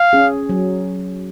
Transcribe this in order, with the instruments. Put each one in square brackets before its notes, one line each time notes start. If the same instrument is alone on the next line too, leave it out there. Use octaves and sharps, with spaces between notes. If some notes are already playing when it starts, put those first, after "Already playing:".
Already playing: [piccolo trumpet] F5
[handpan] C#4 G#4
F#3